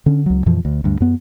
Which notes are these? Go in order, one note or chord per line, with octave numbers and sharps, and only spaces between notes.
D3 C#4
C#2 F#3
F2 A#2 E3 F3
D2
D2 G2
F#2 B3